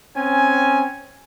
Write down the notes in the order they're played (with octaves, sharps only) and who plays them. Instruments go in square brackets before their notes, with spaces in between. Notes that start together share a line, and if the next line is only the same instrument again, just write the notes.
[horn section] C4 C#4 G#5